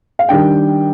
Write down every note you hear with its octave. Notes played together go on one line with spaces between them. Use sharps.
F5
D#3 G3 D4 G5